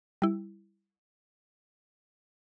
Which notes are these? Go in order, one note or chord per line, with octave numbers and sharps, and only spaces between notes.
G3 E4